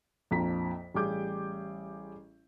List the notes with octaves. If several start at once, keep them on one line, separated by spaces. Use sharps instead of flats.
A#1 F2 F3 A#5 B6
A1 G3 G#4 D6 G6